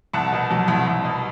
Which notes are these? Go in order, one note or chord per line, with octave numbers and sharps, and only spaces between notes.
C2 F#5 A5
B2
F#3
C2
C2
B2